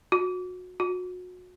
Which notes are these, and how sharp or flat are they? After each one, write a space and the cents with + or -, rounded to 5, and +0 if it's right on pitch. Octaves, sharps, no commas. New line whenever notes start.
F#4 -25
F#4 -30